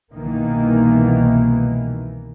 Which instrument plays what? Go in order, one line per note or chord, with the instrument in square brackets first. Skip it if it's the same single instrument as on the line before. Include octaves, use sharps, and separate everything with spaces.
[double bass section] C2 B2 D#3 E3 A#3